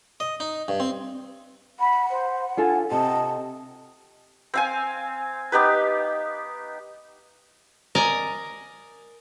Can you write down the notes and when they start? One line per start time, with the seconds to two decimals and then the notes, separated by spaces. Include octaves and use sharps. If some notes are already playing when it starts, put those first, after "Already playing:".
0.20 D#5
0.40 D#4
0.68 G2
0.80 C4
1.80 F#5 B5
2.11 C5
2.57 D4 F4 A4 G#5
2.91 C3 D#5 A5
4.54 C4 F5 G#5
5.52 B3 D#4 G4 B4
7.95 A#4 D5 D#5 G#5 A#5